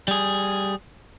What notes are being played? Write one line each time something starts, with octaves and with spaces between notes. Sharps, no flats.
G3 G#4